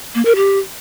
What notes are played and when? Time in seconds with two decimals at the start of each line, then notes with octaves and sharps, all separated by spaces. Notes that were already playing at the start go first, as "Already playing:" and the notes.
0.15 A#3
0.25 A#4
0.36 G4